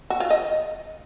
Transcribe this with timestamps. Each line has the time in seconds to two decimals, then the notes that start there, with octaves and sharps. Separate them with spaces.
0.10 F#4
0.20 F4
0.30 D#5